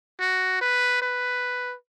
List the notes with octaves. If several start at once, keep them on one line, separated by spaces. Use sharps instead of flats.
F#4
B4
B4